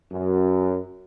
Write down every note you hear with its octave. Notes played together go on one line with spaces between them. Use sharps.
F#2